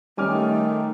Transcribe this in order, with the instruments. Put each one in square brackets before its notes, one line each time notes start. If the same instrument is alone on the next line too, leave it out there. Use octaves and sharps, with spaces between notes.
[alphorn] D#3 [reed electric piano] G3 C#4 [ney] A3 [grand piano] G#5 D6 F6